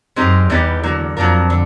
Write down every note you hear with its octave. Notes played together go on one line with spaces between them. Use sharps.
F#2 G#3 C4 D#4 G4 A#4
E2 E3 G3 B3 D#4 G4
D3 F#3 A#3
F2 F#3 A#3 D4 F4 A#4
D3